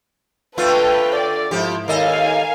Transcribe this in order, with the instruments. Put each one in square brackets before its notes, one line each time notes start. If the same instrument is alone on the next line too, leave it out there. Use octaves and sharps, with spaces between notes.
[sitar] D3 A3 F4 [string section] A4 B4 G5
[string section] D5
[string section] G#2 E4 [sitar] F3 G4
[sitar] D#2 A4 D#5 [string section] A#4 F5 G#5